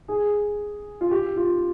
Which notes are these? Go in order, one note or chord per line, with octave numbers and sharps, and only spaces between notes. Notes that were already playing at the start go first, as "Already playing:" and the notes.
G#4
F4
G4
F4